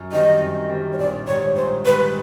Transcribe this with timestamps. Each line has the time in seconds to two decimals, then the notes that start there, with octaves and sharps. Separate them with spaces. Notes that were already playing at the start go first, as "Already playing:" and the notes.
Already playing: F#2
0.12 D#3 G3 C4 D#5
0.42 F#2
0.70 D#3 G3 C4
0.92 C#5
0.98 A#1 D5
1.27 G#2 D#3 G3 C#5
1.55 A#1 C5
1.84 G#2 D#3 G3 B4